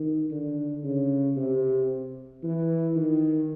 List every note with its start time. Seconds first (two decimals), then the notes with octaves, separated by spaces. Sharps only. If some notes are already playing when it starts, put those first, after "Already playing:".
Already playing: D#3
0.31 D3
0.84 C#3
1.37 C3
2.43 E3
2.96 D#3